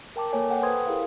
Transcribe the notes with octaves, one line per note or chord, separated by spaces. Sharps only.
A#4 G5 A5 D6
A#3 A4 C#5 G#5
A4 F#5 G5
B4 C5 G5 C6 D#6 G#6
E4 G4 G#4 A#4 F5